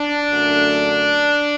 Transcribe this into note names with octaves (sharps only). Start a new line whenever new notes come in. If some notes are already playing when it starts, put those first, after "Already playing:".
Already playing: D4
F#2 D3 A3